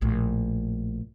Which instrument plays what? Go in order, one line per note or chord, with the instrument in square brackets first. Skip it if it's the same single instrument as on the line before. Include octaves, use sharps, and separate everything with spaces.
[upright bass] A#1 A2